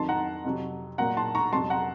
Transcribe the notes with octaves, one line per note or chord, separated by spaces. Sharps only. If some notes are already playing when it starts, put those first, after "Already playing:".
Already playing: F2 D#3 F#3 A5 C6
F#5 A#5
F2 C3 F#3
A#2 F#3 F#5 A#5
A5 C6
A#5 C#6
F2 C3 F#3 A5 C6
F#5 A#5